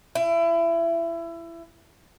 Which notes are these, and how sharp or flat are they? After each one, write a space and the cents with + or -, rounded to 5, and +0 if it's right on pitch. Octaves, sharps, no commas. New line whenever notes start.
E4 +25